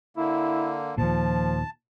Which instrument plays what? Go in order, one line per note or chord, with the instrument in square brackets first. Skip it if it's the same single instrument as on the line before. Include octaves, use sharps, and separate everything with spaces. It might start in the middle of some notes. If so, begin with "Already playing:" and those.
[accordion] D3 A#3 [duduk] E4
[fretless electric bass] D#2 A#2 [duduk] F3 [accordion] A5